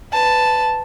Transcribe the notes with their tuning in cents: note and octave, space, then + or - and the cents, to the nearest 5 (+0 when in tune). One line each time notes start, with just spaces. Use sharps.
B4 +20 A5 +0